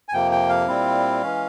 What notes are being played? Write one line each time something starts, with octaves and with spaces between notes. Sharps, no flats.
G#5
F2 C3 F3 A#3 G5
G5
F5
A#2 G3 C4 E4
E3 G#3 C#4